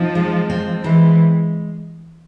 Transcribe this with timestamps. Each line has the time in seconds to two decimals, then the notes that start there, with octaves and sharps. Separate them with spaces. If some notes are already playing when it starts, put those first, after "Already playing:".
Already playing: F3 C4 D#4
0.15 G#3
0.50 C4
0.83 E3 G#3